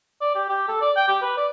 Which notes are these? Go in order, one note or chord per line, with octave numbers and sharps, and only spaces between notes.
D5
G4
G4
A4
D5
G5
G4
B4
D5